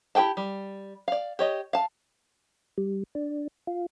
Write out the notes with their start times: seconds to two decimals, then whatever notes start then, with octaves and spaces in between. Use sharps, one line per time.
0.15 E4 G4 G#4 G5 A5
0.37 G3
1.08 D5 F5
1.39 G4 C#5 D#5
1.73 F5 A5
2.78 G3
3.15 D4
3.67 F4